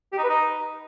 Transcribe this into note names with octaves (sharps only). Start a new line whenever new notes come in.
G4
D#4
B4
D#4